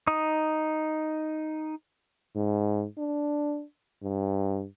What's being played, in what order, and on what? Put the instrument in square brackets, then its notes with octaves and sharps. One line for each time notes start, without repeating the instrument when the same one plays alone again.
[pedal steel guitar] D#4 D#6
[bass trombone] G#2
D4
G2